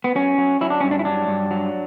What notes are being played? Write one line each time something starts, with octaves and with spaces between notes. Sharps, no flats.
B3
F#3 C#4
F#3
F#3 E4
D4
G2 C#4
D4
E4
F#3 D4
G2
F#3